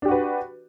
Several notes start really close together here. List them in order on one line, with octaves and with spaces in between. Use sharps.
D4 G4 F#4 B4